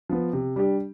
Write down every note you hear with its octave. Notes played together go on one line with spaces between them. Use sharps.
F3 B3
C3
G3 D4 G4